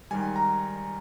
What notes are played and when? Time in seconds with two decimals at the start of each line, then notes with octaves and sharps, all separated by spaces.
0.11 G#2 D#3 G3 G#5
0.36 A#5